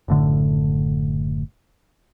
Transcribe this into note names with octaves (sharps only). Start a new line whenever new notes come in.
F#1 A2 D3